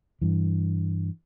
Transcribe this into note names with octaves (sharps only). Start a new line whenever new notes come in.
G2 E3